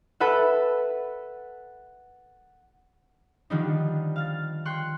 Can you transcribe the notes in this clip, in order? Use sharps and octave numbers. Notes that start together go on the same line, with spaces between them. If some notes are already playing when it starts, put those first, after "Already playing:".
A4 B4 E5 F#5
D3 D#3 F3 G3 D4 D#4
F5 F6 A6
G5 C6 C#6 F#6